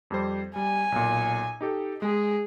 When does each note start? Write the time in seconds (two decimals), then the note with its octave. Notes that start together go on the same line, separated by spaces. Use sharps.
0.10 F2 G3 C5
0.56 G3 G#5
0.92 B1 A#2
1.61 D#4 G4 A4
2.02 G#3 G#4